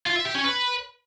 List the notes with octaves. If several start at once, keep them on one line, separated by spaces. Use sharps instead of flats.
F4
E5
G4
C#4
B4